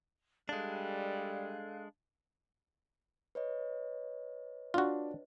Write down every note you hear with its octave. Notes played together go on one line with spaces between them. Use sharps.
G3 G#3 D4 A4 F5 F#6
B4 C#5 D#5
D4 F4 F#4